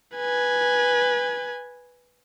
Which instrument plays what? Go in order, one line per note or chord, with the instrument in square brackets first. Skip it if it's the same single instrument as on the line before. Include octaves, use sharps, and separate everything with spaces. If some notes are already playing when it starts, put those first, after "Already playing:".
[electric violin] B4 G#5